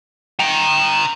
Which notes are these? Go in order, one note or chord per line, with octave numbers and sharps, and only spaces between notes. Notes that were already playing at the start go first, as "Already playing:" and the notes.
G5 A#5